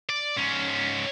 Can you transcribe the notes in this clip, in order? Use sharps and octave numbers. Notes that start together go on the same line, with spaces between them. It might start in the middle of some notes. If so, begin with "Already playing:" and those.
D5
G#2 C#4